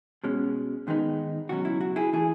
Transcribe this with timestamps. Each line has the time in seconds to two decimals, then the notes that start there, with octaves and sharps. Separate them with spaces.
0.24 B2 G#3 C#4
0.87 G#2 D#3 G#3 B3 D#4
1.49 C#2 B2 F#3 C#4 F#4
1.65 E4
1.81 F#4
1.96 E4 G#4
2.13 E3 A3 E4 G#4